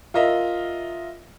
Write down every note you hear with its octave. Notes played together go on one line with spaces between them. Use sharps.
F4 A#4 D#5 E5